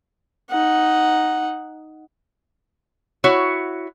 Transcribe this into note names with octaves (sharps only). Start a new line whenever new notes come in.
D#4 F#5
E4 F#4 C#5